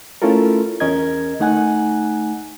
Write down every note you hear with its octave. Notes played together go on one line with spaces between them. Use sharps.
A3 C#4 E4 F4 A4 A#4
E2 C#4 A#4 D#5 G#6
D2 A3 D#4 F#5 G#5 F#6